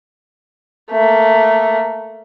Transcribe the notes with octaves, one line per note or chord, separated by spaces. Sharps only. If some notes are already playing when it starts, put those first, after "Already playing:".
A3 A#3